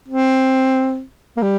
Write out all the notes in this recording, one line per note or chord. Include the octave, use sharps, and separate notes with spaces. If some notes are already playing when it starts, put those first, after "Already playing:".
C4
A#3
G3